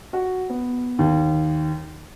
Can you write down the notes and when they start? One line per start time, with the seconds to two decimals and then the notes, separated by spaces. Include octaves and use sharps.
0.13 F#4
0.50 B3
0.99 D#2